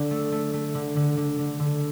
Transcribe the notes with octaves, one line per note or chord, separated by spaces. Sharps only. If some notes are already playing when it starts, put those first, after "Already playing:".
Already playing: D3 D4
A3
A3
A3
D3
D3
D3
D3
D3